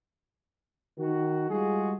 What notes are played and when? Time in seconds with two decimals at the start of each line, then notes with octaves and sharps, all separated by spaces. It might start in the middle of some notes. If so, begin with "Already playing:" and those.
0.98 D#3 F#4
1.50 G3 G#3 F4 F#4 G#4